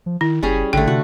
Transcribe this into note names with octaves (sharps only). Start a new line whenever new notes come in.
F3
D#3 E4
F#1 G3 C#4 G#4
A1 D3 A3 G5
C3 F#4